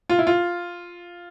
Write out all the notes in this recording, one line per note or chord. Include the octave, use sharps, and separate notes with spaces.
F4
E4
F4